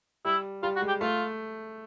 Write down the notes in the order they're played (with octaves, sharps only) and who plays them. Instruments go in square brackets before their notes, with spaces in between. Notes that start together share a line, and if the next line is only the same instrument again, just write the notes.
[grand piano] G3 [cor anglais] E4
[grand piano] G3 [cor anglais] F4
[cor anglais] F#4
[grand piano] G#3
[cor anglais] G4
[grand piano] A3 [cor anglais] F4